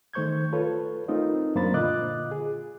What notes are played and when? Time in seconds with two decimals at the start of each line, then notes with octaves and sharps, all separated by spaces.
0.13 D#3 A3 C5 C#6 G6 G#6
0.53 F4 A4 B4 C#5
1.08 A3 C4 D#4 F4 A#4 D#5
1.55 F#2 A#3 D4 C5 B5 A6
1.74 A#2 D3 F4 D#5 D6 F#6
2.31 G#4